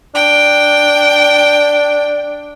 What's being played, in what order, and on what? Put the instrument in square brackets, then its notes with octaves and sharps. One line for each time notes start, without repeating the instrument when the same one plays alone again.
[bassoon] D4 [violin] G5